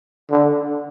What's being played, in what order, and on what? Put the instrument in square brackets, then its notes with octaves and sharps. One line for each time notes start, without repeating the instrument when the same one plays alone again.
[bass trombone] D3